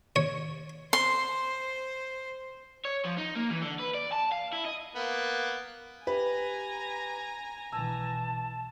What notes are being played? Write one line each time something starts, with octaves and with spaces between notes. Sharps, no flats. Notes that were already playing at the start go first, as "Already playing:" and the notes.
C#5
C5 C6
C#5
F3
D#4
A#3
E3
D3
B4
D5
A5
F5
E4
D#5
A#3 B3
G4 B4 G#5 A#5
B1 E3 A5 E6